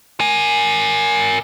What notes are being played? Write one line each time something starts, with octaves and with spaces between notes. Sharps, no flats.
A#4 G#5